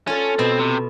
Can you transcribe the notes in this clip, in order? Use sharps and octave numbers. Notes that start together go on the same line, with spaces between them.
C#4 F4 A4
B2 C4
C3